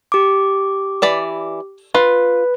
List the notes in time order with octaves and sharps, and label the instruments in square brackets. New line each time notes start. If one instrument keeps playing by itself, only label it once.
[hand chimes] G4 D6
[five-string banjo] E3 D5 B5
[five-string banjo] F4 [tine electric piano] B4